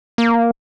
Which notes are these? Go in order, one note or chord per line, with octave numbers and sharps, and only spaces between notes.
A#3